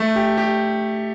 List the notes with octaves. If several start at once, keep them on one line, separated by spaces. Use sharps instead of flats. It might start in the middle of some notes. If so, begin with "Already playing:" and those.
Already playing: A3
G4
G4